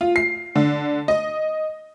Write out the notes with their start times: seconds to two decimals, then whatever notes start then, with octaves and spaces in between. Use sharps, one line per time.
0.01 F4
0.16 C7
0.56 D3
1.08 D#5